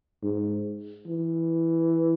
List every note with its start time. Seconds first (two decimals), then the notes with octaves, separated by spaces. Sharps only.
0.23 G#2
1.07 E3